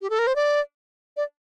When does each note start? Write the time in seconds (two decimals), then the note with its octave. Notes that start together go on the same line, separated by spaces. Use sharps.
0.02 G4
0.10 A4
0.19 A#4
0.27 C5
0.36 D5
1.17 D5